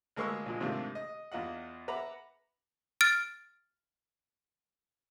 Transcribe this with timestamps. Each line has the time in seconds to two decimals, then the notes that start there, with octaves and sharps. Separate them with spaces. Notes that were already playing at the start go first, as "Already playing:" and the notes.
0.16 D2 G#3 A#3 B4 C#6 E6
0.46 A#1 A#2 G#3
0.60 G#2 C3 D#3 A3 D4 F4
0.95 D#5
1.32 E2 F4 D#5 F#5
1.88 B4 E5 F#5 A#5 D6
3.01 F6 A6 D7